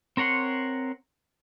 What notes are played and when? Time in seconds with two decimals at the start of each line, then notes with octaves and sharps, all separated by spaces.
0.17 C4 A#4 C#5 F#5 C6